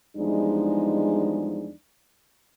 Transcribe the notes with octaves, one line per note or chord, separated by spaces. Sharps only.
E2 F3 G3 G#3 D4 D#4